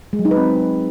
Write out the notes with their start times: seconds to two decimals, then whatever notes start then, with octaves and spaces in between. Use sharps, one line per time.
0.13 G#3
0.19 F#3
0.25 D#4
0.31 B4
0.37 C4